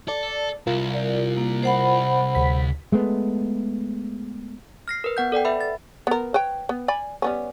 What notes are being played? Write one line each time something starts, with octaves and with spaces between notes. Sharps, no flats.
A4 D5 A5
C2 F4 A#4
D5
A#3
C5 F#5 B5
D2 B6
G#3 A3 B3
F6 A#6 C7
A#4 B4
B3 F#5 G6
A4 D5 F#5 G5
B4 E5 B5
A6
B3 A#4
B4 C#5 G5
B3
D5 G#5 B5
G3 B3 C#4